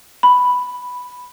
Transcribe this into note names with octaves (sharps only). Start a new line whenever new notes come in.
B5